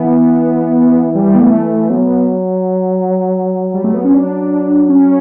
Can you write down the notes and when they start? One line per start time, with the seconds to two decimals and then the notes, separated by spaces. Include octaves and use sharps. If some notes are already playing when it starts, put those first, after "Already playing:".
Already playing: E3 B3
1.15 G3
1.35 B3
1.40 A3
1.65 A3
1.90 F#3 B3
3.74 G3
3.84 A3
3.94 B3
4.04 C#4
4.14 F#3 D4
4.89 C#4